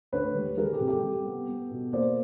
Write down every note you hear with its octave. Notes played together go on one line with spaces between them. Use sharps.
D2 B4 C#5
G3
G3 G#4 A#4
G4 A4
C3
G4 A4
G3
B3
B3
B2
A#3 C5 D5